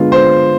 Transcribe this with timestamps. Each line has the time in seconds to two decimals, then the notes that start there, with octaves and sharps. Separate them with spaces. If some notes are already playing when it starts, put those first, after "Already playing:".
Already playing: D3 G#3 B3 F4
0.12 C5